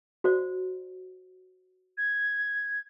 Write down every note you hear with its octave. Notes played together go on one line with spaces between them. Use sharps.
F#4 C5 D5
G#6